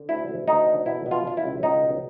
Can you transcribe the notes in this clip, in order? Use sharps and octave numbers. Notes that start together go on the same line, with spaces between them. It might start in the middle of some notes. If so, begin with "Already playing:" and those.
Already playing: D3
D2 E4
D2
D2 D#4
D3
B2 E4
B2
F4
B2 F4
E4
C#2
C#2 D#4
B2